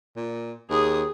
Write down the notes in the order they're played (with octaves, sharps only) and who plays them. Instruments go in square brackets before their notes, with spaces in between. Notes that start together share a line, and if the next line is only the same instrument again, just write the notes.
[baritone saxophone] A#2
[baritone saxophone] D#2 [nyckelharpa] G#4 D#6